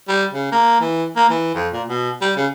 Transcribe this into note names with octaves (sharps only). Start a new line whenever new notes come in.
G3
C#3
A#3
E3
A#3
E3
F2
A#2
B2
G3
C#3